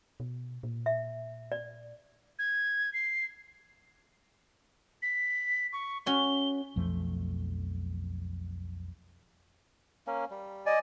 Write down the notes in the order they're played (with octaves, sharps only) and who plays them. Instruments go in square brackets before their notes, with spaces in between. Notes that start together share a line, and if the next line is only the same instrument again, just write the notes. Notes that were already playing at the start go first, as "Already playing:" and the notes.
[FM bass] B2
A#2
[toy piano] E5
D5
[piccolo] G#6
C7
B6
C#6
[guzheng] C#4 F#4 [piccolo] G7
[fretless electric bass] B1 F2 F3 A3
[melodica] A#3 C#4
G3
[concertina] D5 G#5 [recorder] D#5